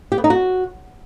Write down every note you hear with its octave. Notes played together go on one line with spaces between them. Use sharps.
G4
B3
D#4
F#4